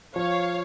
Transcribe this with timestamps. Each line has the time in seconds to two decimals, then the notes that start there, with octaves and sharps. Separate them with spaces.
0.16 F3 C#5 F5